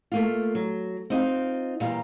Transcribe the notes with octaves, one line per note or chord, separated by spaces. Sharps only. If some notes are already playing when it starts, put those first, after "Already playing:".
A3 A#3 F4
F#3
C4 D#4 F4
E2 A#2 G3 F4 A#5